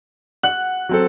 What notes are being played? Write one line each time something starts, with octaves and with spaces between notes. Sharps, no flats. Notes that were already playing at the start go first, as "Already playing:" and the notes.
F#5 F#7
F#3 C4 A4